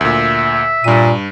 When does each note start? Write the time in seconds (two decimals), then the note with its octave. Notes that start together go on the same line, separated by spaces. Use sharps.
0.01 D2 A#2 E5
0.84 G2 A#2 D#7